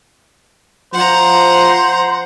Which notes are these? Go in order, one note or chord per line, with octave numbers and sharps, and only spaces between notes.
F3 C5 F#5 A#5